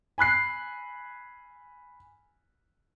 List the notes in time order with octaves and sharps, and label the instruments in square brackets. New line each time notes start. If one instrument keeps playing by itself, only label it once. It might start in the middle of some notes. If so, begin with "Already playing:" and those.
[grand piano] G#5 B5 F#6 C7